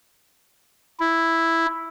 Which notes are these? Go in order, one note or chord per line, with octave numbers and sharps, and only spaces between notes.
E4